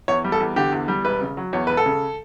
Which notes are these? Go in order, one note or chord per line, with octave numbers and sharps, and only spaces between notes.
E2 C#5
G3
A4
E2
D3 G4
E2
G3
E1 B4
C#3
F#3
E2 C#5
E1 B4
A4
C#3